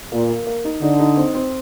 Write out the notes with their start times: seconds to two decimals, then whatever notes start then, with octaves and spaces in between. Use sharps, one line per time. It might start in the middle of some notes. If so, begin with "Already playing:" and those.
0.12 A#2 A#3
0.30 A#3
0.47 A#3
0.65 D#4
0.81 D3 D#4
0.99 D#4
1.17 C4
1.35 C4